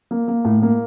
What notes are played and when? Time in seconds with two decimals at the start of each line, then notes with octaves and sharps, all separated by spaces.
0.11 A#3
0.28 A#3
0.45 A2
0.62 A#3